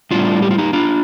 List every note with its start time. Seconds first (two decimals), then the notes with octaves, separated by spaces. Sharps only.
0.11 A2 G3 D4 F4
0.42 G4
0.51 F4
0.58 D#4 G4
0.73 D4 F4